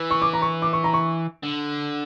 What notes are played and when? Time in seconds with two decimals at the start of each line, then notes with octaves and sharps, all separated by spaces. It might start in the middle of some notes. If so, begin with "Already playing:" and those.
Already playing: E3
0.11 C#6
0.22 D6
0.33 A#5
0.42 C#6
0.62 D6
0.73 C#6
0.84 A#5
0.93 C#6
1.43 D3